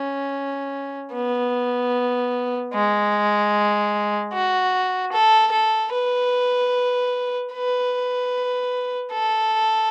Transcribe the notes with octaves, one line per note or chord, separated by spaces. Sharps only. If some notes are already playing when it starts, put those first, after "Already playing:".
Already playing: C#4
B3
G#3
F#4
A4
A4
B4
B4
A4